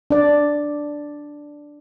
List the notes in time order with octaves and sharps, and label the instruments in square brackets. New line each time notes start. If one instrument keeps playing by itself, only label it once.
[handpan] D4 D5